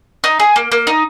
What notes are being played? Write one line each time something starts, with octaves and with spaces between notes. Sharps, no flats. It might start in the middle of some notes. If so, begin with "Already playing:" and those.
D#4
G#4
A#3
A#3
D#4